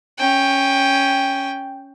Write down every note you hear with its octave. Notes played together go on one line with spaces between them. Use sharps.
C#4 G5